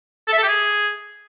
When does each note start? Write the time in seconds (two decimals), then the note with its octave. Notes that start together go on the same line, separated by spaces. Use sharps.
0.27 A4
0.32 E5
0.38 A4
0.43 G4
0.48 G#4